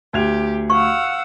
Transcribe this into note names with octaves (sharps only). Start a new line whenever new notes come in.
D2 G4 G#6 F7
F5 F#5 C#6 E6